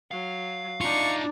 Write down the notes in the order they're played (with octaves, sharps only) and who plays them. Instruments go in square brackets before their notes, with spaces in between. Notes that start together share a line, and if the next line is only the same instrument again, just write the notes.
[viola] F#3 [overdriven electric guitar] F5
[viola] D4 D5 [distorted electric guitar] D#4 F4 [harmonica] C#6